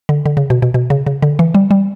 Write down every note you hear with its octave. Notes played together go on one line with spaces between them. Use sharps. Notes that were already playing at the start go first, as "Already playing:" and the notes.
D3
D3
C#3
B2
B2
B2
C#3
C#3
D3
E3
G3
G3